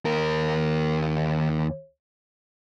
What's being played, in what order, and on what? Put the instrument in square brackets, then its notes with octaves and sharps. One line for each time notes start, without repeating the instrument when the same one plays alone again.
[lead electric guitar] D#2 A#4